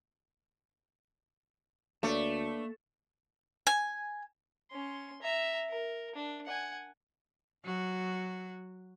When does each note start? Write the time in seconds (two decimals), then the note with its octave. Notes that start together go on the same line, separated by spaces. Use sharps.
2.03 D2 A3 A#3 D4 B4 C#5 A5
3.67 G#5
4.71 C#4 C6
5.22 E5 A#5
5.69 A#4
6.15 D4
6.46 F#5 G#5
7.64 F#3 F#4